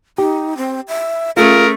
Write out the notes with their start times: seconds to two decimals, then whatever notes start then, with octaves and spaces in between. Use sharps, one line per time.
0.18 D#4 G4
0.57 C4
0.88 E5
1.37 A3 C#4 F4 G#4 A#4